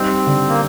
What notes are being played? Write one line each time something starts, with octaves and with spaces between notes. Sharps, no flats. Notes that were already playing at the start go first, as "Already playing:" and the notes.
Already playing: G3 C4 D#4
D3
A#3